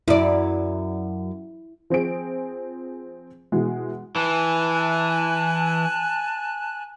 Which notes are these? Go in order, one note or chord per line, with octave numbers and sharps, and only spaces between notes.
F#2 E4 D5
F3 C4 G#4 D7
B2 E3 G#3
E3 G#5 A5 F#6